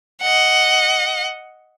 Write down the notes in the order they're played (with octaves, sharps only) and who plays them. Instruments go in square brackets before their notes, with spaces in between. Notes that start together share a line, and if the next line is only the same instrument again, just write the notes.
[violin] D#5 F#5